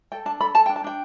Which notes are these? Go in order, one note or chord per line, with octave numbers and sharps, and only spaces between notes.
A4 G5
D4 A5
A4 B5
A4 A5
G5
D4
A5
D4 G5